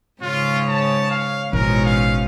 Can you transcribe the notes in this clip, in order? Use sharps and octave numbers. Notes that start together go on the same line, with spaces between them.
G#2 C#3 F4 C#5
A5
F5
A1 G#2 B2 C#4 A#4
F5